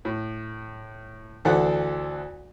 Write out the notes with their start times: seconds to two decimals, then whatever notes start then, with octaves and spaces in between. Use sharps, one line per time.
0.05 A2
1.45 D2 E3 A4 C5 D5 F#5